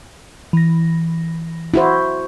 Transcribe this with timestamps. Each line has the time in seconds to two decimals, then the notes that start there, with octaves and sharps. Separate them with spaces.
0.53 E3 A#6
1.74 E4 F#4 C5